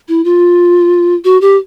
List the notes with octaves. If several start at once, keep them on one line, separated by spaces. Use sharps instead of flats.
E4
F4
F#4
G4